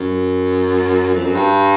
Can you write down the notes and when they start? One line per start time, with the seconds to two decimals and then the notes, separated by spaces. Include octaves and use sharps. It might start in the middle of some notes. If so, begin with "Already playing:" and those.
Already playing: F#2
1.15 F2
1.25 F#2
1.35 G2